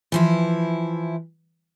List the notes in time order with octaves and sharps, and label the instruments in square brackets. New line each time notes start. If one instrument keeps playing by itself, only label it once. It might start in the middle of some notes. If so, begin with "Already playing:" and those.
[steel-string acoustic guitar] E3 F3 E4